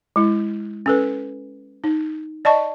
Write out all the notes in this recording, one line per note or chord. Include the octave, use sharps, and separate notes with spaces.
G#3 E4
C#4 A4 B4
D#4
D5 D#5 A5 C#6